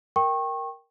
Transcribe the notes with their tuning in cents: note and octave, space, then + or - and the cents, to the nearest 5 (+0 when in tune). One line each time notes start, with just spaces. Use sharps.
A#4 +0 G5 +0 C#6 -30